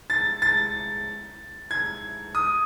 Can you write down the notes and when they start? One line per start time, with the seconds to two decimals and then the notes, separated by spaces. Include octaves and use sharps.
0.10 A6
0.42 A6
1.71 G#6
2.35 D#6